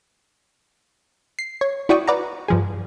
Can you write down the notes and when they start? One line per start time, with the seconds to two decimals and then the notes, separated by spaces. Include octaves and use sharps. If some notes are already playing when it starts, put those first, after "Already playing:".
1.39 C7
1.61 C#5
1.89 E4 F#4 D5 G5 C#6 D#6
2.08 B4 D5 F#5 A#5
2.48 G2 F3 G#4